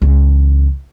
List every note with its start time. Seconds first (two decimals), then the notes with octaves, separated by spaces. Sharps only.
0.02 C#2 E3